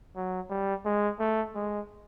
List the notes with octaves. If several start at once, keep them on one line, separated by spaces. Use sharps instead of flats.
F#3
G3
G#3
A3
G#3